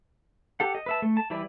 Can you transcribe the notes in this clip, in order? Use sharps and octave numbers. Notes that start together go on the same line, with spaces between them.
G4 A4 F#5
D#5
B4 E5 A5
A3
A5
E3 G3 E4 B4 D5